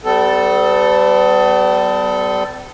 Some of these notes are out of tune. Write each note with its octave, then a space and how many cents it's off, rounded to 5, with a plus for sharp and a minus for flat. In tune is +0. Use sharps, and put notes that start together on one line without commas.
G3 -10 B3 +45 A4 +0